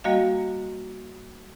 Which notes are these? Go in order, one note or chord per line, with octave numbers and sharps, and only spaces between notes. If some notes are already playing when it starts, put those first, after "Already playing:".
G3 A#3 F#4 D#5 F5